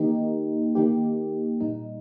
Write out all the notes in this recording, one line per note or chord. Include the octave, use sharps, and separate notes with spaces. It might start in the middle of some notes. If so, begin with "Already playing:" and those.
Already playing: D#3 A#3 D#4 G4
D#3 A#3 D#4 G4
A#2 G3 D#4